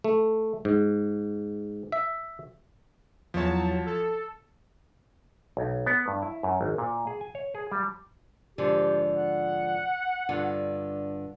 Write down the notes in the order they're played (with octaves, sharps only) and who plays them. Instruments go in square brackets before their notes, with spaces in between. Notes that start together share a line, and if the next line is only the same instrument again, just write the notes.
[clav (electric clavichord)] A3
G#2
E5
[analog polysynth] E2 F#3 A5 [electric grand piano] F3 C#5
[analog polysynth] A4
[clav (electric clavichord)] B1
B3
G2
E4
F#2
G#1
A#2
G#4
G#5
C#5
G#4
G3
[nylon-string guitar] G#2 D3 F3 [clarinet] G4
[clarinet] F#5
[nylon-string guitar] G2 D3 F4